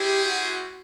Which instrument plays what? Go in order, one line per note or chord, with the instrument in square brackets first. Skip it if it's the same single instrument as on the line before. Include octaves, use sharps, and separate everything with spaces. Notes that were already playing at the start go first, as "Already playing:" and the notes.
Already playing: [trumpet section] G3 C4 E4 G#4 C5 [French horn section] G4
[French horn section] F#4